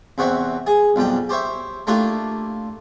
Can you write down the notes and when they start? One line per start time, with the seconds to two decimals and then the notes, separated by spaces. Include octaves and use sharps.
0.18 E2 C3 F#4 C#5 E5
0.67 G#4 G#5
0.96 B1 F2 G3 G5
1.29 G4 C5 C#5 E5
1.87 A3 A#3 D4 E4 F4 G4